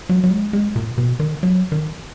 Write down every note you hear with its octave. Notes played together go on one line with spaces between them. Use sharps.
F#3
F#3
G#3
G#3
A#2
B2
D#3
F#3
D#3